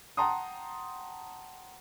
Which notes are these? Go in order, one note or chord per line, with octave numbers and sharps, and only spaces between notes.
F#5 G5 A5 A#5 C6 D#6